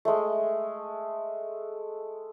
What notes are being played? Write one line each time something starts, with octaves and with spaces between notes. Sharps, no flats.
G#3 A3